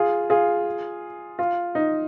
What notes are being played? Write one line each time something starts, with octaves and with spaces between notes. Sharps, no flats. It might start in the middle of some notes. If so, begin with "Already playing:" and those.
Already playing: F4 G#4
F4 G#4
F4
D#4